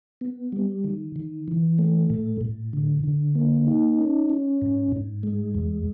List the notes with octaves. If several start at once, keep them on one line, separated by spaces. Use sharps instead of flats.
B3
G3
D#3
D#3
E3
A3
A2
A2
D3
D3
A#3
D#4
C#4
C#4
G#2
G#2
G#3
E2